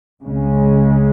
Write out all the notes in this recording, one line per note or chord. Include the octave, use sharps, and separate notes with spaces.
C#2 C#3 G#3 C#4